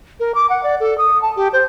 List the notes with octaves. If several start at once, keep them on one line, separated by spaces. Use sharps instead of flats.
A#4
D6
F#5
D5
A4
D#6
A5
G4
C5